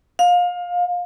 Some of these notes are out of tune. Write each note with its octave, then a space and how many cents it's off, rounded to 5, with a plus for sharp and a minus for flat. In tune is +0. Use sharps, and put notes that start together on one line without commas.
F5 +25